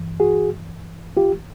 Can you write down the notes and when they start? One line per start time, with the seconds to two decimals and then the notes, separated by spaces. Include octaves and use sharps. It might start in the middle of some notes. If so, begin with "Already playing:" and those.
Already playing: G2 E3
0.20 F#4 G#4
1.17 F4 G4